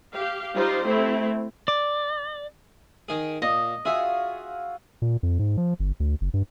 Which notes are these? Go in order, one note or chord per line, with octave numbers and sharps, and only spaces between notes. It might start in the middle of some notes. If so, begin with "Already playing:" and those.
G4 F5
G3 D#4 F4 G4 C5
A3 C4 E4
D5
D#3 G#4
A#2 D#5
F4 F#4 G#4 C#5 E5
A#2
F2
G#2
F3
G1
D2
F#1
G2